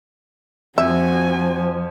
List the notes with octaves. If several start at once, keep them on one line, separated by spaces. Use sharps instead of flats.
F2 F3 F#4 E5 G#5